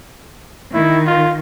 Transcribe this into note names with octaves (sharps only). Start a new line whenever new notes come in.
D#3 E4
F4